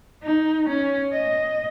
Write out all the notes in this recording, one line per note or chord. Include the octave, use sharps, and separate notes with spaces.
D#4
C#4
D#5